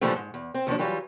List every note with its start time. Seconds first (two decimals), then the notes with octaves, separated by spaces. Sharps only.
0.01 A#2 D3 E3 F3 G3 A3
0.16 G#2
0.34 E2
0.54 C4
0.67 D#2 F3 F#3 D4
0.79 E3 F#3 G3 F4